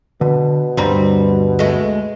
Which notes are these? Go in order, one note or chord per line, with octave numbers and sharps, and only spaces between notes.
B2 D3
D2 G2 G3 C4 A#5
G#3 A3